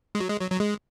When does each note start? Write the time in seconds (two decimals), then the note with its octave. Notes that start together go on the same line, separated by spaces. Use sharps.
0.15 G#3
0.20 F#3
0.30 G#3
0.40 F#3
0.51 F#3
0.60 G#3